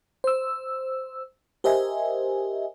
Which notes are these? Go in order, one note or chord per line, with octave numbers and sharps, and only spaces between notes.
C5 E6
G4 A#4 C5 D#5 E5 G#5